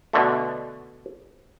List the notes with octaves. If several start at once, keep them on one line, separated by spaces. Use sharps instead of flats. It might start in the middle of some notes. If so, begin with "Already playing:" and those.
B2 D3 A3